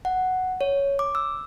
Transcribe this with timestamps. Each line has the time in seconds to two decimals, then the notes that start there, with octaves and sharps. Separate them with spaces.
0.05 F#5
0.61 C#5
0.99 D6
1.15 E6